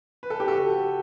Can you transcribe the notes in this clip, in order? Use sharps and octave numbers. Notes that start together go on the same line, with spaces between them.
B4
A4
G4
F#4 A4